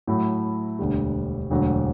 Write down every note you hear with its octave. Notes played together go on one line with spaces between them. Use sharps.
A2 F#3 A3 E4
E1 D2 D3 G3
E1 D2 D3 F#3